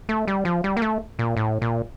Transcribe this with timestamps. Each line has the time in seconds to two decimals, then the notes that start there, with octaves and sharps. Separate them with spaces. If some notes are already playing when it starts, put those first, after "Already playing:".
0.09 A3
0.27 G3
0.45 F3
0.64 G3
0.77 A#3
0.82 A3
1.19 A#2
1.37 A2
1.62 A#2